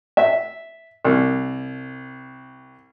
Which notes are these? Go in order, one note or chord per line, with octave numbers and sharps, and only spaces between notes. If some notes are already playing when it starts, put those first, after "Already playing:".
E5
C2